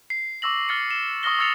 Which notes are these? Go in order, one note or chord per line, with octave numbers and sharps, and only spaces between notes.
C7
C#6 D6 E6 A#6 F#7
F6 A6 C#7
E7
C#6 D#6 F6 A#6 G7
C#6 E6 F6 A6 C#7 F7